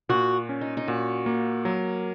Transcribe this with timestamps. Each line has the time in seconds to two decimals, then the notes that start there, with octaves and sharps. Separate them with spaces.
0.09 A#2 F#4
0.49 C#4
0.61 D#4
0.77 D#4
0.88 A#2 F#4
1.26 A#3
1.65 F#3 A#4